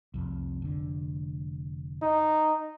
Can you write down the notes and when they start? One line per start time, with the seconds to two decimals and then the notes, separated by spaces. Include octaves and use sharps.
0.14 C2 F2
0.62 F1 D3
2.02 D#4